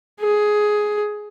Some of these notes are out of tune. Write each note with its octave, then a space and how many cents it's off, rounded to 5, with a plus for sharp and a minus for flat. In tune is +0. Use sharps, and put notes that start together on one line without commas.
G#4 +10